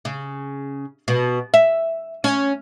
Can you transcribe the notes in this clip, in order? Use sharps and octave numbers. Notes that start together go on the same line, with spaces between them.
C#3
B2
E5
C#4